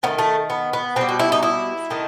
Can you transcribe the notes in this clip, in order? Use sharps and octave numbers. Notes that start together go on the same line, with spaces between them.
D#3 A3 B3
A3
B3
B3
B2 G3 C4
F#4
E4
D#4
E4
D#3 A3